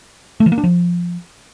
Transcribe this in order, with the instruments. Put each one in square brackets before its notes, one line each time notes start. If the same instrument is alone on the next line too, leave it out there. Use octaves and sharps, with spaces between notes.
[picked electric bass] A3
E3
A#3
D4
F3